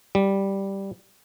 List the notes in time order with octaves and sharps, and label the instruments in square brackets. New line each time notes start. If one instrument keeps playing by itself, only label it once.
[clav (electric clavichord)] G3